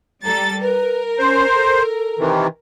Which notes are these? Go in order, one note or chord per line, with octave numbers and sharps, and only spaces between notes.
G3 A4 A#5 A6
A#4 B4
C#4 C5
A4
C3 D#3 E3